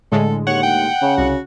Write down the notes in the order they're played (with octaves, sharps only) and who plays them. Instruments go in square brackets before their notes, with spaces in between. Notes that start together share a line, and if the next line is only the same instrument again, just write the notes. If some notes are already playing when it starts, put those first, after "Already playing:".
[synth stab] A2 D3 G#3 [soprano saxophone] A4
[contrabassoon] D#2 [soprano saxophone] C#5 [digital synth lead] F#5
[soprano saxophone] G5
[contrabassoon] C#3
[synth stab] C2 [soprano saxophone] F#4